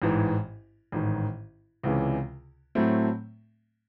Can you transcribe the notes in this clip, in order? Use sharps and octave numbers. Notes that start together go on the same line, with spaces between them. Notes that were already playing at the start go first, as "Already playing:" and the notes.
A1 G#2 E3
A1 G#2 D#3
C#2 C3 E3 G#3 C#4
A2 F#3 A3 C4